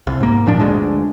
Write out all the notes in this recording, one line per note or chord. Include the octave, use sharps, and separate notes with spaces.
C2
G#2 A#3
F1 A#2 F3 D4
G1 D2 G#3 D4